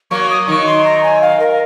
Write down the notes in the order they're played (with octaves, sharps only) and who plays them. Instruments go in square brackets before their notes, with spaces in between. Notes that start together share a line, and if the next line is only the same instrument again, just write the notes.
[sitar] F#3 A#3 [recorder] C#6
[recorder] D#6
[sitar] D#3 F#3 [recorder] C#6
[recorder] C6
A#5
G#5
F5
A#4